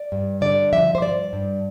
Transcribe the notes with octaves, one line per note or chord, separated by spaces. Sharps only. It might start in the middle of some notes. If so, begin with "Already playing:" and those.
Already playing: D5
G2
D3 D5
F3 E5
C5
G2 D5
G2